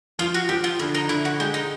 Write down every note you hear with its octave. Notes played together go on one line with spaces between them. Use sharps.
F3 F4
F#4
F3 G4
F4
D3 E4
D#4
D3 E4
F#4
G#3 G4
D#4